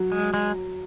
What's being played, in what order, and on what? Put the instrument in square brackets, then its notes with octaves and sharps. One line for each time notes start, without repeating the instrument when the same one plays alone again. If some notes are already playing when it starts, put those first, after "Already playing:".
Already playing: [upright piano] F#3
[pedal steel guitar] G#3
G#3